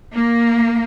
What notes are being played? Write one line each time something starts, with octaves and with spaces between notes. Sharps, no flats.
A#3